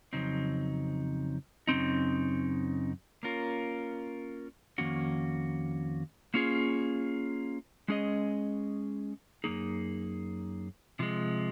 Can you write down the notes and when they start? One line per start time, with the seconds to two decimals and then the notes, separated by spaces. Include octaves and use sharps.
0.13 F2 C#3 F#3 C4 D#4
1.67 F#2 C#3 F#3 C4 D#4
3.23 A#3 C#4 F4 A#4
4.78 F2 D#3 A#3 C#4 F#4
6.34 A#3 C#4 F4 G#4
7.88 G#3 C#4 G#4 D#5
9.44 F#2 F3 A#3 D#4 G#4
10.99 C3 F3 G#3